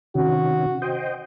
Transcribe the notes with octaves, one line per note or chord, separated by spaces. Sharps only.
C3 D#3 C#4 F#4
C5 D#5 G5